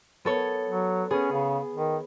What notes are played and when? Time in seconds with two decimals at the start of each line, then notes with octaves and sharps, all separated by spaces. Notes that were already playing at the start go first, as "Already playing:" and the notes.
0.25 B3 A4 C#5
0.69 F#3
1.10 B3 C#4 G#4
1.32 C#3
1.74 D#3